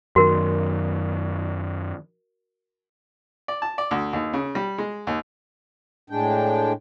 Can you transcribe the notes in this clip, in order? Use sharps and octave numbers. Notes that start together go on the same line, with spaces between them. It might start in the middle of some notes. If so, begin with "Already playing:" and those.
F#2 D#3 F#4 A#4
D5
A5
D5
D2
D#2
C#3
G3
G#3
D#2
A2 G#3 D4 G5